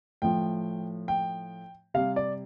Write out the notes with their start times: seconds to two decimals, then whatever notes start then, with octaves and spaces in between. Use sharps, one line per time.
0.22 A2 F3 G5
1.08 G5
1.94 C3 G3 F5
2.16 D5